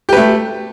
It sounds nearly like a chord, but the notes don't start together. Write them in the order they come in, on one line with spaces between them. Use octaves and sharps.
G4 B4 A3